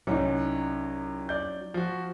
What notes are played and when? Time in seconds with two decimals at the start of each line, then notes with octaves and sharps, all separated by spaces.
0.07 C2 F#3 C#4 D#4
1.29 D5 G6
1.74 F3 F#4